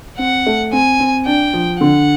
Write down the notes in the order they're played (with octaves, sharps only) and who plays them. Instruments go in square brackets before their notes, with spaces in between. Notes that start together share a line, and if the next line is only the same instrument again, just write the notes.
[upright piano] C4 [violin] F#5
[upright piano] A3
[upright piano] C4 [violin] G#5
[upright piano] C4
[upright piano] D4 [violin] G5
[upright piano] F3
[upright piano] D3 [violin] F#5